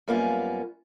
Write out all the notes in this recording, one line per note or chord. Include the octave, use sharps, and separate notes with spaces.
F#2 G3 A#3 B3 F4 G#5